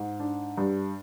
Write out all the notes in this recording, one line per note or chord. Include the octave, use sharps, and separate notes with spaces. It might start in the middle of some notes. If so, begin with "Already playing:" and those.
Already playing: G#2
D4
G2